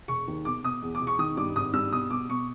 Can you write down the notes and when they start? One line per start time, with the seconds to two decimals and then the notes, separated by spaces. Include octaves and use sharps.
0.08 E1 C#6
0.28 D#2
0.45 B2 D6
0.64 B2 D#6
0.82 E2
0.95 D6
1.00 B2
1.07 C#6
1.19 D#3 D#6
1.37 G2 D6
1.56 G#1 D#6
1.73 G2 E6
1.92 B2 D#6
2.10 B2 D6
2.29 B2 C#6